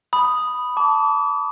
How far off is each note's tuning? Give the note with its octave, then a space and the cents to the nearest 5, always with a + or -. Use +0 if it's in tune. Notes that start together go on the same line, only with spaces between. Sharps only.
B5 +0 D#6 -5
A5 +0 D6 -35